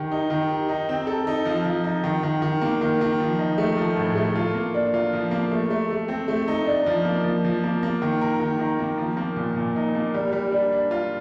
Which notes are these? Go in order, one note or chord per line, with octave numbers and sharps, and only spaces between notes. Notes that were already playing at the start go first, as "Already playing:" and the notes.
Already playing: D#3 G4
D#4
D#3
G4
D#4
C4
A4
D#4
F3
F3
D#4
D#3
D#3
D#3
A#3
D#3
D#3
F3
D#4
A3
F3
A2
A3
F4
A#3
D4
F4
F3
A#3
A3
A3
A3
C4
A3
D#4
D4
F3
A#3
F3
F3
A#3
A#3
D#3
A#4
D#3
D#3
A#3
F3
A#3
A#2
A#2
D#4
A#3
G3
G3
D4
D4
F4